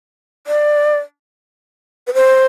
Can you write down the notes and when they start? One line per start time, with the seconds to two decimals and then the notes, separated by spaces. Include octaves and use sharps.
0.47 D5
2.07 B4
2.14 C5